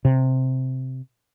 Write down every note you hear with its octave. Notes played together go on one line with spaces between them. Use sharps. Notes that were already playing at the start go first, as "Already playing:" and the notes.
C3